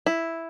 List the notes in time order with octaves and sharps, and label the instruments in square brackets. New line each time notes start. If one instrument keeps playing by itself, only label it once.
[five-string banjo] E4